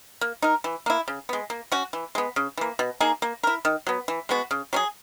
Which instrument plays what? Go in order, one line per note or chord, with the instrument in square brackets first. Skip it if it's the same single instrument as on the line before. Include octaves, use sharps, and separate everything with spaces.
[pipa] A#3
D#4 A#4
E3
A#3 E4
C#3
G#3 B3
A#3
C#4 F#4
E3
G#3 B3
C#3
E3 A#3
B2
A#3 D#4 G#4
A#3
E4 A#4
D#3
F#3 B3
E3
G#3 B3 F#4
C#3
F#3 C#4 G#4